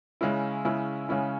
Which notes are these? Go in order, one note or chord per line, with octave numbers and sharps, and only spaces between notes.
C#3 G#3 C#4 E4
C#3 G#3 C#4 E4
C#3 G#3 C#4 E4